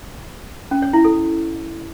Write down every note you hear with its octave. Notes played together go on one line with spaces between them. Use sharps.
C#4
C#5
E4
A4